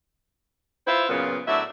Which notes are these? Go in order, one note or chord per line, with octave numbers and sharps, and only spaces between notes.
E4 F4 B4 C5 E5
F#2 A#2 C#3 B3 F4
A2 F#3 D4 E5